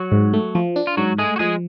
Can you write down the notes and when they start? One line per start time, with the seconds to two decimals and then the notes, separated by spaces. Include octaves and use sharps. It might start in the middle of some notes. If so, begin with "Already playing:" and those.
Already playing: F#3 F#4
0.12 G#2
0.33 A3
0.55 F3
0.76 D4
0.87 F4
0.97 G#2 F#3 F#4
1.18 G#3 A3 G#4
1.36 F#4
1.39 F3 G#3 G#4